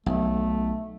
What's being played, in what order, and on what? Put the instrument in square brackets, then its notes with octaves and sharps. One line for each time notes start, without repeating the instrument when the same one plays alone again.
[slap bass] B1 [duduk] A3